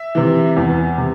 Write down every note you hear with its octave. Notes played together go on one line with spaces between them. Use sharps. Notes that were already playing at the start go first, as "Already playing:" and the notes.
Already playing: E5
C3 E3
E2
C3